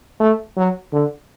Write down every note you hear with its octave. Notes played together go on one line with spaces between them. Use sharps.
A3
F#3
D3